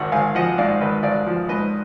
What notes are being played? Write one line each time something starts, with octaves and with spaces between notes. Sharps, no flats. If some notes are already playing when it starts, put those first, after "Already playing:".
Already playing: G#1 G#2 F#5
G#1 F5 G#5
F3 D#5 F#5
G#2 D5 F5
G#1 B4 D#5
G#1 D5 F5
F3
G#2 B4 D#5